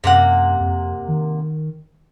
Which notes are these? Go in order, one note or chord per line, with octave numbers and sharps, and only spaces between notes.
F#2 C3 A#3 F#5
F2
D#3